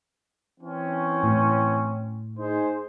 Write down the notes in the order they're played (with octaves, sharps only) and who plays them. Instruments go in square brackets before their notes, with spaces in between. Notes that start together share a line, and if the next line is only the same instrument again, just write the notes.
[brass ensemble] E3 C4 C#4
[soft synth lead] A2
[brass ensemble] D#4 G#4 C5